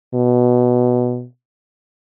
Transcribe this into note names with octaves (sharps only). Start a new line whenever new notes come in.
B2